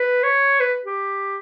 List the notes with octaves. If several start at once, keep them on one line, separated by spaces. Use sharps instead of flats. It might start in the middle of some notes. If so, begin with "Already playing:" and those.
Already playing: B4
C#5
B4
G4